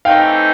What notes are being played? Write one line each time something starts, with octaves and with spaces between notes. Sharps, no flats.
E3 A3 C4 D#4 G4 F5 G5